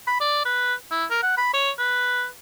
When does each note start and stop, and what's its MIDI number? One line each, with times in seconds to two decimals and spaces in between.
0.07 0.17 83
0.20 0.42 74
0.45 0.74 71
0.91 1.05 64
1.10 1.18 70
1.23 1.33 78
1.37 1.49 83
1.54 1.71 73
1.78 2.26 71